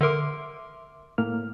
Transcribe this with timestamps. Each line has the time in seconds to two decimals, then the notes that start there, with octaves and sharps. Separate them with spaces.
0.01 D3 A#4 E5 C6 D6
1.18 A2 A#3 F6